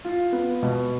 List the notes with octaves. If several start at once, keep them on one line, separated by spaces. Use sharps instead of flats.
F4
B3
B2